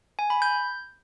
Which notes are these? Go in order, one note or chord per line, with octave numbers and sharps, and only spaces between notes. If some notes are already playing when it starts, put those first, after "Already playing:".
G#5
B5
G6